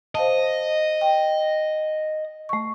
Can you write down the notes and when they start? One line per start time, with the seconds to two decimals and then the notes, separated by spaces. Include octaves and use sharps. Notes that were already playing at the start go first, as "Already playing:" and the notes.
0.15 C5 D#5 F5 A5
1.01 G5
2.49 A3 C#6